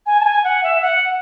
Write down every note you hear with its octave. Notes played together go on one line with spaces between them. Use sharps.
G#5
A5
G#5
F#5
E5
F#5